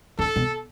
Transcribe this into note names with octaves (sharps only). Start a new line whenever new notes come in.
D3 A4
B2